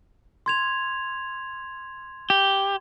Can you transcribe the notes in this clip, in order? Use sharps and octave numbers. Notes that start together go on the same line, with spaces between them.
C6 G#6 F7
G4